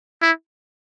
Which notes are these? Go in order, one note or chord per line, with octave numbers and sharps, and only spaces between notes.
E4